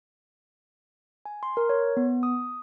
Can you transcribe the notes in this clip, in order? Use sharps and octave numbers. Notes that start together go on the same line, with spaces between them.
G#5
C6
A#4
C#5
B3
D#6